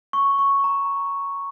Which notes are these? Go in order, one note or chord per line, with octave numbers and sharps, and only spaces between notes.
C#6
C#6
A#5